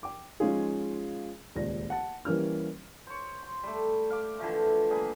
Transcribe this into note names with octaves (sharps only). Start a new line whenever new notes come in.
G5 D6
F3 G#3 C#4 D#4 F4 G#4
D#1 C#2 D5 A#6
F#5 A5
E3 G3 A#3 C#4 F6
C5 C#5
C6
G3 A3
F5 D6
D3 E3 F3 A3
G3 A#3 G#4 B4